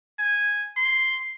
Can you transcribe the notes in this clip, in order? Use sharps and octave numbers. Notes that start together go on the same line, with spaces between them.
G#5
C6